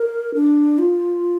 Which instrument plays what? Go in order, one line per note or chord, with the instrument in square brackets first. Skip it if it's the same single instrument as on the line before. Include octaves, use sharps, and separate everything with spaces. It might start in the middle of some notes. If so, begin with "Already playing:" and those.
Already playing: [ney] A#4
D4
F4